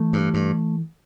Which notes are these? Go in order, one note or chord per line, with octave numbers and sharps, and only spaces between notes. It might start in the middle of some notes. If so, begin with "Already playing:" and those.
Already playing: E3 A3
G2
G2